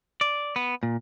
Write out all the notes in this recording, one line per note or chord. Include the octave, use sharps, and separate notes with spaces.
D5
B3
A#2